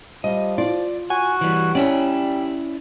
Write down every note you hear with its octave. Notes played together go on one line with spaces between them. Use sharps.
F3 G3 D#5
F4 D5
F#4 G#5
E3 G3
G3 C#4 E4 D5